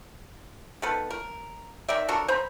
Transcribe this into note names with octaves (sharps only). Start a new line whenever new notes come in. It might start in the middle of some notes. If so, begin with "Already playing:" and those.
D#3 B3 A4 B4
A#4
D#3 A#4 D5 E5
D4 F#4 A4 A#4
C5 A#5 B5